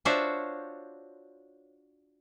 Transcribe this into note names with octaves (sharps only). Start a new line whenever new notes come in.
D4 F4 F#4 C5 C#5 E5